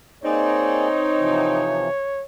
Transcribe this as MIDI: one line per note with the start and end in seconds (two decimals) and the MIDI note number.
0.23 0.88 58
0.23 1.88 60
0.23 1.88 63
0.23 0.88 68
0.23 2.25 73
0.23 0.88 74
1.16 1.89 48
1.16 1.89 52
1.16 1.89 53